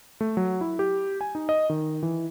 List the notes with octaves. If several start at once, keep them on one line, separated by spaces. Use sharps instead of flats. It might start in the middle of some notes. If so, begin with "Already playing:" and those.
A3
F#3
E4
G4
G#5
D#4
D#5
D#3
E3